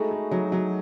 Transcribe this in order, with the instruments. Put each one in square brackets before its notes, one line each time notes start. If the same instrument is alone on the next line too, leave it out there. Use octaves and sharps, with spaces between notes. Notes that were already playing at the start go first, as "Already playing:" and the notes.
Already playing: [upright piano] G#3 A3 [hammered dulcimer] D#4 E4 F#4 G#4
[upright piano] A3
[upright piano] F#3 [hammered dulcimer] D#4 F#4
[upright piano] F#3